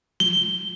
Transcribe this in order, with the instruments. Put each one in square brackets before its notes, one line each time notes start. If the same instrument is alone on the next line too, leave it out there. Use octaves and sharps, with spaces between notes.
[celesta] G7